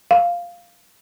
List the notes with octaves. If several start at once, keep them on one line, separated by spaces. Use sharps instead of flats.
F5